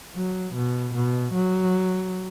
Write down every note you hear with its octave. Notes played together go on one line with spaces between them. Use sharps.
F#3
B2
B2
F#3